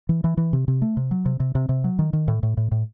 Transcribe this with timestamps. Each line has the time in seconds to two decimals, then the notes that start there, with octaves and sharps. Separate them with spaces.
0.09 E3
0.24 E3
0.37 E3
0.53 C3
0.68 C3
0.82 A3
0.97 C3
1.11 F#3
1.26 C3
1.40 C3
1.55 C3
1.69 C3
1.84 F#3
1.99 D#3
2.13 D#3
2.28 A2
2.43 A2
2.57 A2
2.72 A2